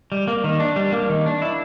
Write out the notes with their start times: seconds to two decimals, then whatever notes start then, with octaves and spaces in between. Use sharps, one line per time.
0.12 G3
0.28 A#3
0.44 D#3
0.60 D4
0.76 G3
0.93 A#3
1.09 D#3
1.26 D4
1.42 E4